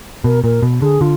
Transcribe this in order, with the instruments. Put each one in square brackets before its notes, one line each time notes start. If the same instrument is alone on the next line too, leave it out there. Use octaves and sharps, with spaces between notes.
[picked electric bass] B2 [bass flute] A#4
[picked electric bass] A#2 [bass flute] A#4
[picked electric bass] B2
[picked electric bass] D3 [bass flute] G#4
[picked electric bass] D3 [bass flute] F4